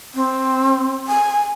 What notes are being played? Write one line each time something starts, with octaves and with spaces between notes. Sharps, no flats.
C4
G#5